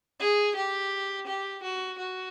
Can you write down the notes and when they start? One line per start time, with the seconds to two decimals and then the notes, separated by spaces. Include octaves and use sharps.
0.20 G#4
0.55 G4
1.26 G4
1.63 F#4
1.98 F#4